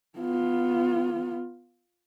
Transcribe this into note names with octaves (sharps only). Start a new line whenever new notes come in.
B3 F4